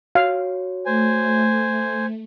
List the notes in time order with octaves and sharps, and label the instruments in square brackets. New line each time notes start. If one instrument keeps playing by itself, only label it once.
[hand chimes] F#4 C#5 [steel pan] F5
[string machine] A3 [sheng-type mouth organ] C5 G#5